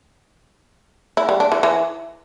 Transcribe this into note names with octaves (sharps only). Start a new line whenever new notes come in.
E4
G3
D4
E3
E3